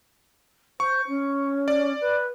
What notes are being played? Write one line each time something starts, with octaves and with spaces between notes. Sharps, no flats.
C5 C#6
C#4
D5
B4